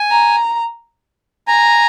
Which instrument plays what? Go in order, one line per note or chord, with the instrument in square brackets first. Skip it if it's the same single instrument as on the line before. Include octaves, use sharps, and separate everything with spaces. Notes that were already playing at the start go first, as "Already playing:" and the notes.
Already playing: [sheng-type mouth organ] G#5
[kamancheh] A#5
[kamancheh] G#5 [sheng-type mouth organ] A#5